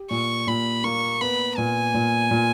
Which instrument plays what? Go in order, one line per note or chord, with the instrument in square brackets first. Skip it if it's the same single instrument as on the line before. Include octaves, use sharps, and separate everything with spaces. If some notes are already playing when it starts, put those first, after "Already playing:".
Already playing: [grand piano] G4
[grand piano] A#2 [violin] C#6
[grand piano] A#2 [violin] B5
[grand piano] A#3 [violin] C#6
[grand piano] B3 [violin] B5
[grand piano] A#2 [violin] G#5
[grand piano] A#2
A#2